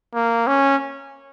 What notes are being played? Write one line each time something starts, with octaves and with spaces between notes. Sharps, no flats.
A#3
C#4